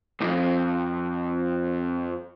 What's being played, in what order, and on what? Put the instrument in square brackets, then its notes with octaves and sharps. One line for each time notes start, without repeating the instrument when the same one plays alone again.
[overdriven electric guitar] C2 F2